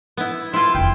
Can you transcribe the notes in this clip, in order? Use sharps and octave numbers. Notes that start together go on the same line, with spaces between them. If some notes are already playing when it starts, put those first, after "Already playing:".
B3 E4
E4 F4 C6
F1 E3 G5